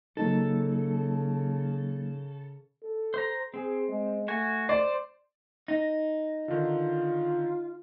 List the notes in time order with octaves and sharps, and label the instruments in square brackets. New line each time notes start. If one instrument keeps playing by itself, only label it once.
[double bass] C#3 [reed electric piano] F#3 A#3 D#4 [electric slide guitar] A4
[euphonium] A4
[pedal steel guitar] C5 A#5
[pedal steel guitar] C4 [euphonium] G#4
[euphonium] G#3
[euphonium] A3 [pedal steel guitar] F#4 G#5
[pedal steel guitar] C5 [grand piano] D5
[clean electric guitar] D#4 [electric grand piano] A#6
[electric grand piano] D3 D#3 [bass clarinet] F4